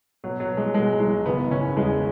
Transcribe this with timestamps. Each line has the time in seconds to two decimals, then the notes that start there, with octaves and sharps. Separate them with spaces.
0.24 B2 F#3
0.40 F#3
0.49 B2
0.57 G#3
0.74 B2 G#3
1.00 B1 G#3
1.26 F#1 B3
1.51 F#1 C#4
1.76 E2 G#3